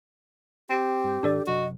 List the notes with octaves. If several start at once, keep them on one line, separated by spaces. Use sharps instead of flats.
C4 G4
G2
G#2 D#3 D4 A4 D5
F#1 C3 F#3 F#4 D#5